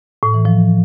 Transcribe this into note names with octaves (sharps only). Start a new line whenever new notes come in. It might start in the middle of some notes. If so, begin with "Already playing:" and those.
A2
E3
F3